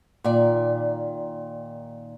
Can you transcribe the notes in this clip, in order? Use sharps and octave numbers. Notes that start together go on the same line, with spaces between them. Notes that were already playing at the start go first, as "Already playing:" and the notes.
A#2 D#3 D5